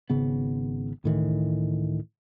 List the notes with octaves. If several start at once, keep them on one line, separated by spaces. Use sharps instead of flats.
G#1 C#3 B3
C#2 A2 D#3 E3